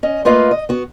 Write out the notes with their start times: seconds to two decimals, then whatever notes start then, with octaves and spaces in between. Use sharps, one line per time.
0.03 C#4 D#5
0.25 A3 A#3 F4 B4 D#5 F5
0.51 D#5
0.69 B3 F#4